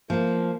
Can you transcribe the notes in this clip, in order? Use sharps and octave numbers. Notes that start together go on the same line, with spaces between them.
F3 A#3